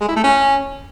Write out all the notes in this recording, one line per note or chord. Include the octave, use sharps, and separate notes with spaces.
G#3
E4
A3
C#4